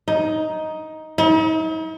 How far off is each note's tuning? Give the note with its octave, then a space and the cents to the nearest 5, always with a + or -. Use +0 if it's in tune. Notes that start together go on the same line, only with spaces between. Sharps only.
D#4 +10
D#4 +45